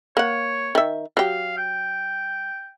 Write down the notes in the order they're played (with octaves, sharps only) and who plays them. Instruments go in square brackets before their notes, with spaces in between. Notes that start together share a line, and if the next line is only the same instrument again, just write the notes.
[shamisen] A#3 F#5 [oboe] C#5
[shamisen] D#3 E5
[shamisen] F#3 G4 [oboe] F5
[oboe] G5